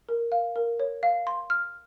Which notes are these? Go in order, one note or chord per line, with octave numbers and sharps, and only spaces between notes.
A#4
F5
A#4
C#5
F5
C6
F6